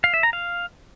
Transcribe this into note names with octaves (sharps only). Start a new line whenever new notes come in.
F5
E5
A#5
F5